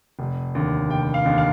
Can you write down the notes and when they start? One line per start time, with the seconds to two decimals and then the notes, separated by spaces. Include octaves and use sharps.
0.19 F1
0.55 D#2 D3
0.90 F1 G5
1.14 F5
1.25 D#2 D3
1.38 F5